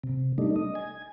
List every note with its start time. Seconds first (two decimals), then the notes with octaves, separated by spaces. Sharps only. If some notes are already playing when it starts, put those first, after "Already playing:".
0.03 C3
0.38 G3 A3 D4 D#4
0.56 D#5
0.75 G#5